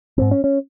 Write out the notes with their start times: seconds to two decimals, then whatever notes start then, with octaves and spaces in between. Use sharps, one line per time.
0.18 G#1 G#2 C4
0.31 C#4
0.44 C#4